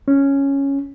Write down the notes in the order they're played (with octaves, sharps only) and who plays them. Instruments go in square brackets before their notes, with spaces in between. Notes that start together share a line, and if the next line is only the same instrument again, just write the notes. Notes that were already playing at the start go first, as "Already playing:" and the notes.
[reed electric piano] C#4